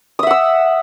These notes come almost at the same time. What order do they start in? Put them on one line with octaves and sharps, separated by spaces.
D#6 E5 F#5 E6